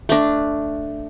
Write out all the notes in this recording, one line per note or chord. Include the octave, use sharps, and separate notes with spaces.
A3 D4